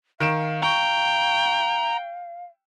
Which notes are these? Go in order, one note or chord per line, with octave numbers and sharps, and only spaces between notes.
D#3 F5 D7 E7
G5 A#5 C#6